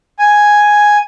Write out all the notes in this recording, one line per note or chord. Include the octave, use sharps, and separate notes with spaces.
G#5